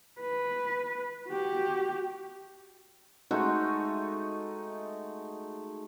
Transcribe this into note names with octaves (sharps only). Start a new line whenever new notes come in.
B4
F#4 G4
G#3 A3 D#4 F#4